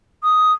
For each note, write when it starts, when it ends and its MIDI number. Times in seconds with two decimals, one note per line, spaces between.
0.23 0.52 87